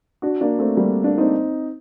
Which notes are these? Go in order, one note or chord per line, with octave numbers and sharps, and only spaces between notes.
D4 F#4
A#3 D4
A3 C4
G3 A#3
A#3 D4
C4 D#4